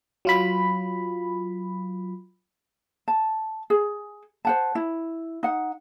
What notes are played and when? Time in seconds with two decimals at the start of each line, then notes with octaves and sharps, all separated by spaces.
0.25 F#3 F4 B5
3.08 A5
3.70 G#4
4.45 C5 F#5 A5
4.75 E4
5.43 D#4 F#5